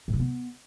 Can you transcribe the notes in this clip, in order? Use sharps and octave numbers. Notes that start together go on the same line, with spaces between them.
A2
C3
B3